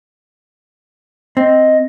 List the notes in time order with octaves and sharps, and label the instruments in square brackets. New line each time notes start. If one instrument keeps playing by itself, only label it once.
[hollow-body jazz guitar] C4 [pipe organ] D#5